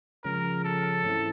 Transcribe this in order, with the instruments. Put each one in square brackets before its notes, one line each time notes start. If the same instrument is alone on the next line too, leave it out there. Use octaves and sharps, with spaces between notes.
[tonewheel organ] C#3 F3 G#3 C#4 [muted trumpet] A#4
[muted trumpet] A4
[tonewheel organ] G#2 E3 A3 C4 E4